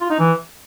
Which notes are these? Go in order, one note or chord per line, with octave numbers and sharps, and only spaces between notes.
F4
D#4
E3